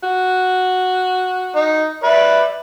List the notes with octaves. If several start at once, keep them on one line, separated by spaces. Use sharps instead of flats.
F#4
D#4
B4 D5 E5